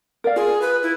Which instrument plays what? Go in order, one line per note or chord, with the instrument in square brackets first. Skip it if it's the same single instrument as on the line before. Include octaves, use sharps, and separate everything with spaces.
[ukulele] A#4 D5 F5
[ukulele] F4 [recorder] G#4
[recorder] B4
E4